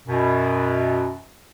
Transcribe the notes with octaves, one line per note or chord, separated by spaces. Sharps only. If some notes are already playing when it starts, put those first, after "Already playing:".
F#2 B2